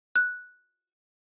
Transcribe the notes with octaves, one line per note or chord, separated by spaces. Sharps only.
F#6